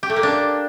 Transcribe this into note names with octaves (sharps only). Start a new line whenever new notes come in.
G4
A3
A#3
D4